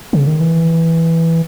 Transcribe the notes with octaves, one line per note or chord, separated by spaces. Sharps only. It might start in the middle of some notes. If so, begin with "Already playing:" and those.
C#3
D#3
E3